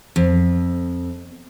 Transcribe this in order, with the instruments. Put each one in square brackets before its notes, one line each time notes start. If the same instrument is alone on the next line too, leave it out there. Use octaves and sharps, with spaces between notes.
[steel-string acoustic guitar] F2